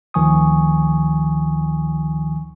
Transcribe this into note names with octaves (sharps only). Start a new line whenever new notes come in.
D2 D#3 F3 G#5 C#6 D#6